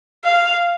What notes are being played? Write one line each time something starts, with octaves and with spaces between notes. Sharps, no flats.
F5